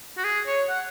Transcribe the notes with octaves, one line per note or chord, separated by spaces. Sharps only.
F#4
G#4
C#5
F#5